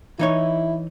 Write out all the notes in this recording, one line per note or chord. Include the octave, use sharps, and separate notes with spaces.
E3 D#4 E4 C#5